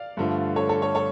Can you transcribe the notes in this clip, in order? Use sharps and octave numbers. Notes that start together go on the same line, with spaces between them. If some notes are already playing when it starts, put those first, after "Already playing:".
Already playing: D5 F5
G2 D3 F3 A3
A4 C#5
A4 C#5
A4 C#5
A4 C#5